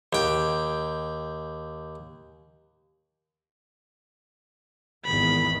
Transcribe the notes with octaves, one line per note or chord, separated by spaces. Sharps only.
D#2 G5
G#1 E2 D#3 B5